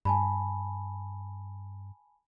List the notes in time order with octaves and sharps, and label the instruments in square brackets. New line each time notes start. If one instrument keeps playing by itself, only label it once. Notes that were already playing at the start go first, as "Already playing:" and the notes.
[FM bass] G2 [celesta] G#5 A5 B5